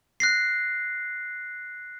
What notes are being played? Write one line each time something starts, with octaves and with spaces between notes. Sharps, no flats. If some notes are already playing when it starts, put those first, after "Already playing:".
F#6 A#6 C7